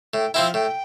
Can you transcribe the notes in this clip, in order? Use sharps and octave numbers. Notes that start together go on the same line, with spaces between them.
A2 G5
F3 C4 E4 F5 G5
A2 G5